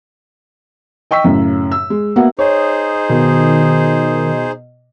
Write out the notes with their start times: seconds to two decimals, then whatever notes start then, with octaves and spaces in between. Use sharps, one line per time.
1.11 D#5 G5 C#6 E6 B6
1.24 F#2 A2 C#3
1.72 E6
1.90 G#3
2.16 A#3 B3 F#4 E5 F#5
2.39 D#4 G#4 C5 C#5
3.09 B2 D#3